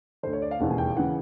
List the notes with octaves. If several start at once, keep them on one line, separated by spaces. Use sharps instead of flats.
D2 D3 C5
C#5
D5
F5
E1 D#2 C#3 E3 F#5
G#5
G5
C#3 E3 F#5